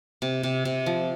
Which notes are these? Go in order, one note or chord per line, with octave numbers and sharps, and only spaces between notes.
C3
C3
C3
F3